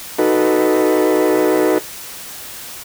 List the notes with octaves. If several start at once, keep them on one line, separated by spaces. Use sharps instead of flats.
D#4 F#4 A4 B4